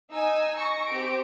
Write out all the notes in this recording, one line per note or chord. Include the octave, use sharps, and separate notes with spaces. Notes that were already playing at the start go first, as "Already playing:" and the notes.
D#4 G#5 E6
C#6 A#6
C4 G4 D7